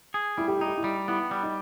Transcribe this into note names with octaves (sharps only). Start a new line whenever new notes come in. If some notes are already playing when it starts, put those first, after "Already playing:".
G#4
G3 E4
G4
D#4 E4
G4
E4
G3
B3 E4
G3
D#4